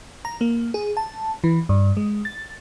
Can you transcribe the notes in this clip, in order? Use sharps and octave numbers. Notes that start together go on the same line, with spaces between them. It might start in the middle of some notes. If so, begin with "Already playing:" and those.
A#5
A#3
G#4
A5
E3
G2
G#3
A6